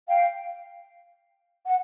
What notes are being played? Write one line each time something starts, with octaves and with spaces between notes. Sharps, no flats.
F5 G5
F#5